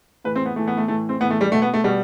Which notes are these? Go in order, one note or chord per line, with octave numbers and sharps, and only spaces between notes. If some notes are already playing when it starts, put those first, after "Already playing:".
A2 E3 B4
C4
B3
A2 E3 A3
B3
A3
A2 E3 A3
C4
A2 E3 B3
A3
G3
B2 A3
B3
A3
B2 G3